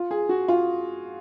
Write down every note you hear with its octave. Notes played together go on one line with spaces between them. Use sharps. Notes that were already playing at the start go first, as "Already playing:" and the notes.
Already playing: F4
G#4
F#4
F4